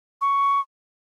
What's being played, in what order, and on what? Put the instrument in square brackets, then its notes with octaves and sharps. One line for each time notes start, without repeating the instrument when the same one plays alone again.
[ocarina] C#6